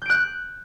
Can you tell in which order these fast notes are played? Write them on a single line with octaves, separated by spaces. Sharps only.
G6 D7 F#6